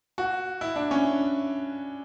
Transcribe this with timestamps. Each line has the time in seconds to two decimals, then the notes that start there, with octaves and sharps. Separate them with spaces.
0.18 F#4
0.61 E4
0.76 D4
0.91 C#4